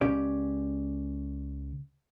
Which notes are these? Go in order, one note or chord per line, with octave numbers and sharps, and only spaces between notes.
C#2 C#4 G4 D5